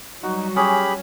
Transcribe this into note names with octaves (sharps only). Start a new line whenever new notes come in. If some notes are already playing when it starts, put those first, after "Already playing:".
F#3 G3 D#4 F#4
C#4 G4 G#4 G#5 B5 D#6 F6